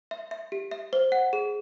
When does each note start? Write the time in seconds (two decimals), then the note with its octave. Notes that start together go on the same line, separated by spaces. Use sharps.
0.11 E5
0.31 E5
0.52 G4
0.71 E5
0.93 C5
1.12 F#5
1.33 G#4